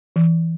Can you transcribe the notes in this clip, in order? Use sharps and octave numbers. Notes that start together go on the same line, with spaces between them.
E3